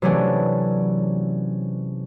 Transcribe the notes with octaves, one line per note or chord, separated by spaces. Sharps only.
C3 E3 F#3 A3 C#4 D4